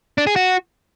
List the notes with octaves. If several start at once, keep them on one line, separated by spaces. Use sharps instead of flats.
D4
G#4
F#4